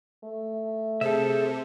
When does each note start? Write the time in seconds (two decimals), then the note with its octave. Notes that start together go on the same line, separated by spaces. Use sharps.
0.24 A3
1.01 C3 G#4 A4 C5 E5